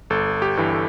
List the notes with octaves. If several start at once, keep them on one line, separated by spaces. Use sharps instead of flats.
G1 A4
G4
G2 E3
A4